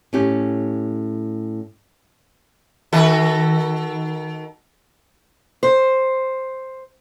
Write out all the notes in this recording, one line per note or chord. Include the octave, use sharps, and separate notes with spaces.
A2 C#4 G4
D#3 F#4 A4
C5